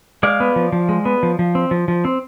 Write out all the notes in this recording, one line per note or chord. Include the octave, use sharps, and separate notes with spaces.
G#3 D5 F5
B3
F3
F3
G#3
B3
F3
F3
C4
F3
F3
C4